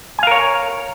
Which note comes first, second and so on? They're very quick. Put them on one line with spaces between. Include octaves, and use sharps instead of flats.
G#5 F5 A#4 C#5